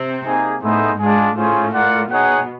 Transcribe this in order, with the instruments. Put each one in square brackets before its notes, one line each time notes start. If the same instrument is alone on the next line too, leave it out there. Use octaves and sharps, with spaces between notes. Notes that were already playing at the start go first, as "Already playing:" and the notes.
Already playing: [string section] C3 C4
[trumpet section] A#3 D#4 G#4
[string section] A2 A3 [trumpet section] B3 D#4 G#4 C5 E5
[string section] G#2 G#3 [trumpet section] D4 F4 G#4
[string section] A2 A3 [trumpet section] C#4 F4 G#4 C5
[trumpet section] F4 A#4 D5 F#5
[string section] B2 B3 [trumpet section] D#4 G#4 C#5 F#5